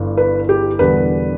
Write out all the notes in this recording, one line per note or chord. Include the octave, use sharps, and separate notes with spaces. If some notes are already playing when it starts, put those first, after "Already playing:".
Already playing: G1 G2 E3
B4
G4
E1 E2 D3 G3 B3 B4